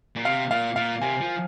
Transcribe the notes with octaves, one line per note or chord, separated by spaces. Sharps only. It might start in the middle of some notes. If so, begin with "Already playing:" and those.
A#2
C3 F5
A#2 F5
A#2 F5
C3 G#5
F3